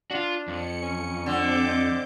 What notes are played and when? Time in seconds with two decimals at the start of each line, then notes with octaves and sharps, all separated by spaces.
0.11 D4 F4 F#4
0.48 F2 C#7
0.82 C#4
1.26 D3 C4 D6 G6
1.67 D#5